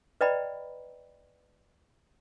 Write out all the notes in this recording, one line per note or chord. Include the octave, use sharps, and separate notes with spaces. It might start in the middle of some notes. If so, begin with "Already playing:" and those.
B4 D5 D#5 G5 A#5 B5